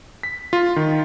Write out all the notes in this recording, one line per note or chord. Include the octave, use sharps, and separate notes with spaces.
B6
F4
D#3